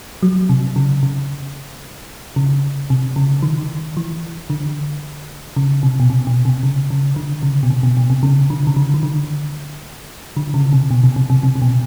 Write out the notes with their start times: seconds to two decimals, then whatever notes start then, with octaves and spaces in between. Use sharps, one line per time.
0.23 F#3
0.49 C3
0.76 C#3
1.03 C#3
2.36 C#3
2.90 C3
3.16 C#3
3.43 D#3
3.97 E3
4.50 D3
5.56 C#3
5.83 C3
6.00 B2
6.10 C3
6.27 B2
6.45 C3
6.63 C#3
6.90 C#3
7.16 D3
7.43 C#3
7.63 B2
7.70 C3
7.83 B2
7.97 B2
8.10 C3
8.23 C#3
8.50 D3
8.67 C#3
8.77 D3
8.94 D#3
9.03 D3
10.37 D3
10.54 C#3
10.73 C3
10.91 B2
11.04 C3
11.16 C3
11.30 C3
11.43 C3
11.56 C3
11.62 B2